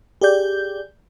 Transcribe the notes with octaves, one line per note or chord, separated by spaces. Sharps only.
G4 G#4 D5 G6